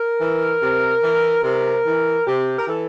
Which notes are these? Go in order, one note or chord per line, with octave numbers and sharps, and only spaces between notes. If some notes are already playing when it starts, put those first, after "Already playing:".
Already playing: A#4
E3
C3
E3
C3 A#4
E3
C3 G4
A#4
E3 A4